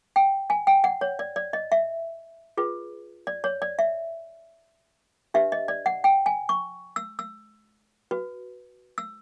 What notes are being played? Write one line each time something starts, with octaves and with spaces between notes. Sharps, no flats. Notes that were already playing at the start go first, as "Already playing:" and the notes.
G5
G#5
G5
F#5
C#5
D5
D5
D#5
E5
F4 G#4 B4
D5
C#5
D5
E5
D4 G4 B4 E5
D#5
D5
F#5
G5
G#5
C#6
E6
E6
F#4 B4
E6